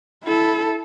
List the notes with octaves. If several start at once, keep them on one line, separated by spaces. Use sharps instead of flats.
E4 A4